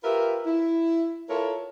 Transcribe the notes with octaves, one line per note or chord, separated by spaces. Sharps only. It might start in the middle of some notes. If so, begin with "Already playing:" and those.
F4 G4 A#4 B4 E5
E4
E4 F4 A4 A#4 C#5